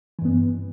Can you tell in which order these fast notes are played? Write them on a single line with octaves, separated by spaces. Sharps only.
E3 G2 B3